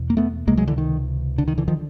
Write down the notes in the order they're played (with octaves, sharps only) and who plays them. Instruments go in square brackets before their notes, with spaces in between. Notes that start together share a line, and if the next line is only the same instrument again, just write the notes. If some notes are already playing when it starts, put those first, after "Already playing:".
Already playing: [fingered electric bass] E2 B2
A#3
A3 B3
C#2 C3 G#3 A#3
F#3 G#3
D3 E3
D#3
D3
D#3
D3 E3
D3 D#3 F3